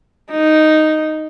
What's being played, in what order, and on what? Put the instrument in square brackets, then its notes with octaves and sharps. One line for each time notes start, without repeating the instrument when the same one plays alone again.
[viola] D#4